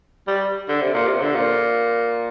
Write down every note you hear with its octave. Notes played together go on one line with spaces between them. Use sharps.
G3
D3
C3
A#2
C3
D3
A#2